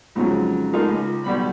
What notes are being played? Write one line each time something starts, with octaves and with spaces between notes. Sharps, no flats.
F2 G#2 C#3 F3 F#3
G#3 A3 D#4 F4 G#4 A#4
C#2
B1 G3 B5